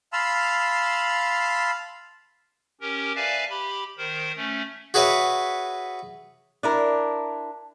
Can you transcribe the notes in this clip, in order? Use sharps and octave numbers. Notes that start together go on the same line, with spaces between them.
F5 A5 B5 C6 E6 F6
C#4 G4 A#4
B4 D5 E5 F5 G#5 A5
G4 B5
D#3 A#4 C5
A3 C#4
F#4 G#4 B4 C#5 E5
D4 E4 A#4